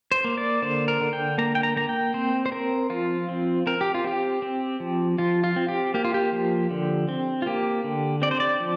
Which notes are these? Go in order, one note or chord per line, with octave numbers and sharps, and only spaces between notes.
C5
A#3
D5
D3 C5
A#4
D3
G5
A#3 A#5
G5
A#5
A#3 A#5
G5
C4 C5
C5
C4 A#4
F3 F4
C4
C4 A#4
G4
F4
C4 G4
C4
F3
F3 F4
F4
C4
G4
A#3 G4
F4
G4
F3
D3
C4
F4
A#3 G4
D3
C4 D5
C5
D5
F3